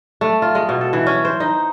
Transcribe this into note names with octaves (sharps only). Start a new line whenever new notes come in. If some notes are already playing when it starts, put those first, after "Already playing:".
A3
F4
G#3
B2
A4
E3
C#4
C5
D#4